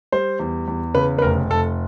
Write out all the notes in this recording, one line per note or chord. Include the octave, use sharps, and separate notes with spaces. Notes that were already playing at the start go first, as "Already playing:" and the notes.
G3 C5
E2
E2
C#3 B4
B4
F1 A#4
F1 A4